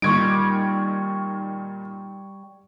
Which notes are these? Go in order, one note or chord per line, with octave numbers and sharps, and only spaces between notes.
A#2 D#3 G3 D#4 C#6 G#6 D7